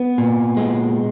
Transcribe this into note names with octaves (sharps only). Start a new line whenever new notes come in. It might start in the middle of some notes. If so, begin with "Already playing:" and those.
Already playing: B3
A#2
G#3